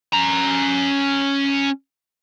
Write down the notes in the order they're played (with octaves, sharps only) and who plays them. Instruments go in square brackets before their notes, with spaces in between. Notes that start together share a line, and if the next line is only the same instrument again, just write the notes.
[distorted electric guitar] C#4 A#5